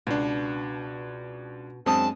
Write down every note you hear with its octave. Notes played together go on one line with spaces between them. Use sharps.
C#2 B2 D4
F#2 G#3 C4 D4 A5 D#6